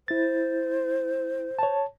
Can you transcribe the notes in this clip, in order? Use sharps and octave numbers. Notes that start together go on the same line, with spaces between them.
E4 C5 A6
C#5 A5